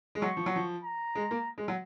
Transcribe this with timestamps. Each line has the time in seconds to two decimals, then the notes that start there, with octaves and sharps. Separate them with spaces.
0.15 G#3
0.22 F#3 C#6
0.37 F3
0.46 F#3
0.56 F3
0.84 A#5
1.15 G#3
1.31 A#3
1.58 G#3
1.68 F#3